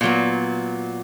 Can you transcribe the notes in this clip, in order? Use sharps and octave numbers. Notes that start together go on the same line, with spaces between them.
A#2 F#3 B3